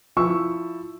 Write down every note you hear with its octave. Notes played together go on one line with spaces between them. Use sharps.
F3 E4 C#6 E6